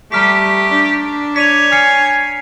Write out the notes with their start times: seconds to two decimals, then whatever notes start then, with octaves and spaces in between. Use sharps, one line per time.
0.12 G3 A3 G4 A#5 F6 B6
0.69 D4
1.36 C#5 D5 B6 D#7 F7
1.72 G#5 F6 C7 C#7